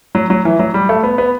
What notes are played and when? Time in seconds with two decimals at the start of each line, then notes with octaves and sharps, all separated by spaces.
0.15 F#3
0.30 F#3
0.45 E3
0.59 F#3
0.74 G3
0.89 A3
1.03 B3
1.18 B3